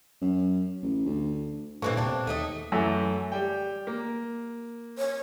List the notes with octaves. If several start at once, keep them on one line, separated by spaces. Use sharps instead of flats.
F#2
A1
D2
E1 G2 A#2 E3 A3 A#3 C5 C#6
C3 C4 D4 A5
D#2 A3 D#4 D#5
F#2 E3 A3
G3 G5
A#3
C#5